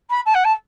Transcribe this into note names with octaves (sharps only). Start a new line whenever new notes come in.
B5
A5
F#5
A5